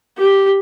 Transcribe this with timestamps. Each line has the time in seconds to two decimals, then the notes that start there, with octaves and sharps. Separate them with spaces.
0.18 G4